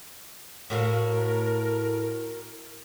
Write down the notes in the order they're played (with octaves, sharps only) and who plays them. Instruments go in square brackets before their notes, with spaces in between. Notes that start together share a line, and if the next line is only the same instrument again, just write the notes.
[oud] A2 F#4 F5 [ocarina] A#4